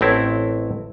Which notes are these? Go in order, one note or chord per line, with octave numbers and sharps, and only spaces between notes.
A1 A2 C4 E4